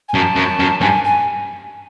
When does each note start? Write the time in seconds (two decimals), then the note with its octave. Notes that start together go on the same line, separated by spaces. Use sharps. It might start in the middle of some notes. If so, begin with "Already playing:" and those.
0.09 G#5
0.14 F#2 A5
0.36 F#2
0.60 F#2
0.81 G2 G#5
1.04 G#5